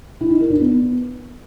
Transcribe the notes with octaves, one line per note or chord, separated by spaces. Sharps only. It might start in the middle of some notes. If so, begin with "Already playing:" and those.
E4
D#4
A#4
D4
B3